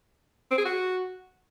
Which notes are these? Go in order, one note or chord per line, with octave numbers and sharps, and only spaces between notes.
C4
G#4
F#4